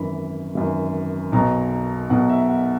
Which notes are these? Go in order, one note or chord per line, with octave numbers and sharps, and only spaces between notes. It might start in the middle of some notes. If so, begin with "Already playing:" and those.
Already playing: G#1 F#2 E3 B5
G#1 F#2 E3
B1 B2 A#5
B1 B2 F#5
E5
F#5